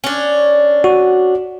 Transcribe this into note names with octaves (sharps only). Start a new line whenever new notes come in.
C#4 D4
F#4